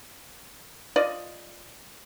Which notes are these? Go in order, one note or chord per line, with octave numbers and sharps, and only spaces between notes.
F4 D5 D#5